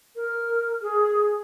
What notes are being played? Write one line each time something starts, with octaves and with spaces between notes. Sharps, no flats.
A#4
G#4